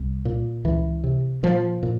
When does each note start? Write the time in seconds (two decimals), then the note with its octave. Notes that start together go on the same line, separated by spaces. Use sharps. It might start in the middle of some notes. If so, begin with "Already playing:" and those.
Already playing: C2
0.25 A#2
0.64 C#2 E3
1.04 C3
1.43 A#2 F3
1.83 A#2